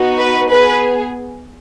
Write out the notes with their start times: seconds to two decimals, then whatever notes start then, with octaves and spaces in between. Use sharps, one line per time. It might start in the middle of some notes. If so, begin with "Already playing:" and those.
Already playing: B3 D#4 F#4
0.19 B4
0.51 B3 G#4 B4